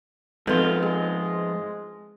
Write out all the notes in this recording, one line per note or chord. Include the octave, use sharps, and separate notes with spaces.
G#2 F3 G#3 B3 C4 F4 A4 B4
G#3 G#4